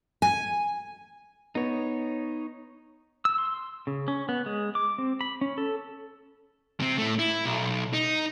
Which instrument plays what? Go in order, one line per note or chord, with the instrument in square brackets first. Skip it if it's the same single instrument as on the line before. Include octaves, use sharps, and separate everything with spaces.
[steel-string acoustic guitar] G#5
[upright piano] B3 [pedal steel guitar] D#4 C#5
[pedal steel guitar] E6
C6
C#3
C#4
B3
G#3
D6
C4
B5
C#4
A4
[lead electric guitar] C3 C4
A2 A3
E4
B1
D#4